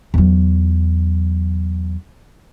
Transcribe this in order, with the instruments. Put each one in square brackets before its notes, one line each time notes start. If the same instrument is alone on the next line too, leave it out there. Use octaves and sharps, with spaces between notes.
[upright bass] E2 F#3